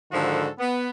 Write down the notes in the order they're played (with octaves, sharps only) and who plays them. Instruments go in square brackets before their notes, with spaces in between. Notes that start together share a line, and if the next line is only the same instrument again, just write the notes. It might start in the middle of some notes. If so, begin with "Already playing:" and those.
[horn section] G#2 D3 D#3 F3 F#4 A4
B3